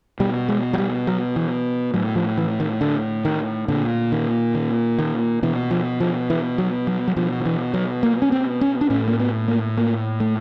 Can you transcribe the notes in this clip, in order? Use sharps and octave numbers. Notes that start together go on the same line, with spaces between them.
B2 G3
G#3
F#3
G3
F#3
E3
A2 F#3
F3
E3
D#3
D3
D#3
A#2 D3
D#3
D#3
D#3
B2 E3
F3
F3
E3
F#3
F#3
F#3
B2 F3
F3
E3
F#3
A#3
C#4
C4
C#4
D4
A2 C#4
A#3
B3
A#3
A#3
A3